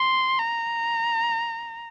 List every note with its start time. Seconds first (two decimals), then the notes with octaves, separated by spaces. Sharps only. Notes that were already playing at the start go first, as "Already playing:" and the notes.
Already playing: C6
0.38 A#5